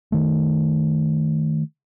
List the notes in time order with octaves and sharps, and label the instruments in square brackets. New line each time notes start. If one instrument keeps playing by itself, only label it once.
[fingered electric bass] D#3 A3